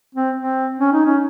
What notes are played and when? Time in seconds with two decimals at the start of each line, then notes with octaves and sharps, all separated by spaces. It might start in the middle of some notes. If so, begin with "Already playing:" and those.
0.15 C4
0.36 C4
0.80 C#4
0.92 D#4
1.06 C#4